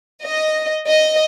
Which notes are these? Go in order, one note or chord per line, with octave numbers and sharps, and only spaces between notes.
D#5
D#5